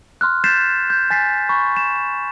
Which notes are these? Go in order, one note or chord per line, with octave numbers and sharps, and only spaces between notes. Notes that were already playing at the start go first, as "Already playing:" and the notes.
C6 F6 F#6
G6 A6 B6 C7 E7
G6
G#5 A6 B6 C7
B5 C#6
E7